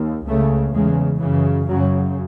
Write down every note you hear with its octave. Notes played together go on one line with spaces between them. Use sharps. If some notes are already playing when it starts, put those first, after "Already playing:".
Already playing: D#2
C#2 C#3 A3
E2 C#3 G#3
F#2 C#3 E3
F#2 C#3 F#3